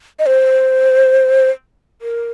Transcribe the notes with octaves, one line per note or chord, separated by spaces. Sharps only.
D#5
C5
A#4